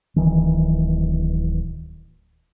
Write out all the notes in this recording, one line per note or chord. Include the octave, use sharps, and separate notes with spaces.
D1 A#1 D#3 E3